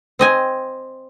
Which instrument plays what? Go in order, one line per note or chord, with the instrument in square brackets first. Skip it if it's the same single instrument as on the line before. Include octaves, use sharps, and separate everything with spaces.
[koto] C4 D#5 G#5